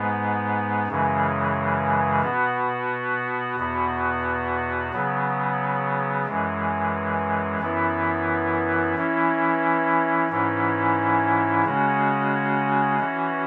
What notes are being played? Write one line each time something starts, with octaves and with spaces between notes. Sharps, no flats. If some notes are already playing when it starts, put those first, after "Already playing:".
Already playing: G#2 G#3 B3
F#2 C#3 E3 G#3
B2 B3 F#4
E2 B2 B3 F#4
C#3 F#3 B3
F#2 E3 G#3
F#2 E3 B3 E4
E3 C#4 E4
G#2 E3 C#4 E4
C#3 G#3 C#4 F#4
E3 C#4 F#4